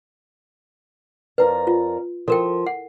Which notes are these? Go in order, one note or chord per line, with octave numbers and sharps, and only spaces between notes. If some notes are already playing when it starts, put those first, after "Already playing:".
F2 A#4 B4 D5
F4
F3 A4 A#4 G5
F#5